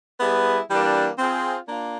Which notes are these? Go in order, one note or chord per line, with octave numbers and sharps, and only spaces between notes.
G3 B3 E4 G#4 B4
E3 G3 A#3 D4
C4 F4 G#4
A#3 D4 F4